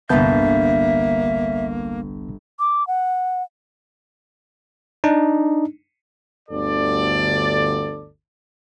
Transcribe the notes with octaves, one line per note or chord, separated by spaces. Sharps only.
G1 C2 A#3 B3 E5 A5 G6
D6
F#5
D4 D#4
G1 D2 A4 D5